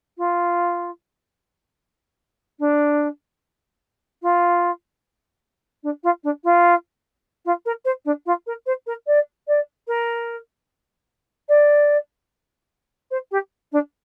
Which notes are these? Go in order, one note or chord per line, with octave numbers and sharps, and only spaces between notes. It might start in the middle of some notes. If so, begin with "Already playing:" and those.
F4
D4
F4
D4
F4
D4
F4
F4
A#4
C5
D4
F4
A#4
C5
A#4
D5
D5
A#4
D5
C5
G4
D4